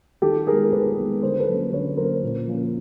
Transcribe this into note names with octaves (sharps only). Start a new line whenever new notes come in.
D#3 G4 A4
G#3 B3 G#4 A#4
A#4
D#3 A4 B4
G#3 B3
D3 A#4 C5
A4 B4
F#3 A#3 C#4
D3 B4 C#5
F#3 A#3 C#4 A#4 C5
A#2
F3 A#3 C#4